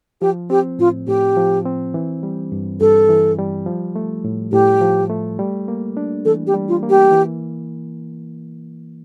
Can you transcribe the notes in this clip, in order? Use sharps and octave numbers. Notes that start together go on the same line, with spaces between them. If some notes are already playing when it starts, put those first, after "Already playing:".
F3 G4
C4 G4
A2 F4
A2 G4
F3
C4
E3
G3
G2
G2 A4
E3
G3
F3
A3
A2
A2 G4
F3
A3
G3
A#3
D4
E3 A4
G4
G3
F4
A#3
G4
E3